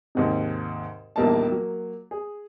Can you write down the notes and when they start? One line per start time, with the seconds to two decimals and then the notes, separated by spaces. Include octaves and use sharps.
0.15 D#2 G#2 C3
1.16 A#1 E2 G3 A#3 D#4 A5
1.49 F#3 A#3
2.11 G#4